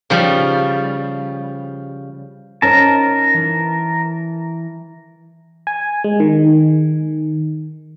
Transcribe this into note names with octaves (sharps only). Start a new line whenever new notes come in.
C#3 F3 G3
C#4 D#4 A#4 C5 A5
E3
G#5
G#3
D#3